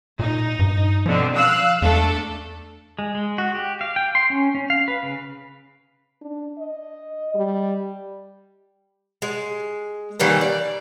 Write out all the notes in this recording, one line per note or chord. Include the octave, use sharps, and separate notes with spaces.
A#2 D#4
G2
B2 D3 F3 C4
F5 E6 F#6
E2 A3 D4 A4
G#3
G#3
F#4
G4
F5
G5
C6
C#4
C#4
F5
B4
C#3
D4
D#5
G3
G#3
D#3 E3 G3 A#3
D5